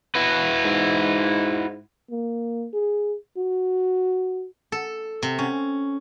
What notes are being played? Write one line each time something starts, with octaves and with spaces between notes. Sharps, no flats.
E4 F#4 B4
G#2
A#3
G#4
F#4
A4
C3
C#4